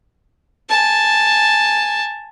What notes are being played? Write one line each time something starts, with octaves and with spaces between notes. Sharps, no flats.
G#5 A5